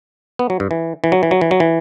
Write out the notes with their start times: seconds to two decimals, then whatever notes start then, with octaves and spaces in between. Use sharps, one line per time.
0.39 B3
0.50 F#3
0.60 G2
0.71 E3
1.04 E3
1.12 F#3
1.23 E3
1.31 F#3
1.41 E3
1.51 F#3
1.60 E3